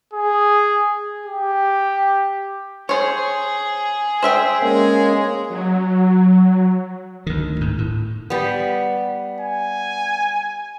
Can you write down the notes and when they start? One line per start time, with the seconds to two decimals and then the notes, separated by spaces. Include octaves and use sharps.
0.14 G#4
1.26 G4
2.89 G#4 C5 C#5
4.23 C5 E5 G5
4.62 G#3 A#3 C#4
5.50 F#3
7.27 D2 D#3
7.61 G#2
7.78 A2
8.30 G3 B3
9.40 G#5